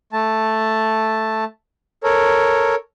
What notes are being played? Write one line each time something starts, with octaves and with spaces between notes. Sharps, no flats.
A3 A5
A4 A#4 C#5